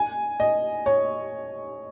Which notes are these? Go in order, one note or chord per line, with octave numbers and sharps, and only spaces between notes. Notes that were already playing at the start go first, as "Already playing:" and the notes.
Already playing: G#5
D#5
C#5